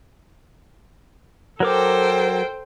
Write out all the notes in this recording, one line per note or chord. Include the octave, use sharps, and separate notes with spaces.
F#3 A4 A#4 C5 G5 D6